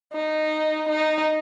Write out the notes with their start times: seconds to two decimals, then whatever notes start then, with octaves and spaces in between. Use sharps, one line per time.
0.13 D#4
0.89 D#4